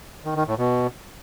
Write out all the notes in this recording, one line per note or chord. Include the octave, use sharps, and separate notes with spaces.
D#3
D#3
A2
B2